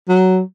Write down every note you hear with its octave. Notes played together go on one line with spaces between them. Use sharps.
F#3